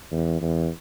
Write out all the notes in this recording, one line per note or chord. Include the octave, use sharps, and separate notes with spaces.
E2
E2